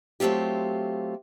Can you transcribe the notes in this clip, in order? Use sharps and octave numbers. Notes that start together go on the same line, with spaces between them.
F#3 A3 C4 F4 G4